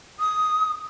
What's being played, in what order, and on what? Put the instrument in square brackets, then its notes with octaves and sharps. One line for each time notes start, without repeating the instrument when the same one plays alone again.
[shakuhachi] D#6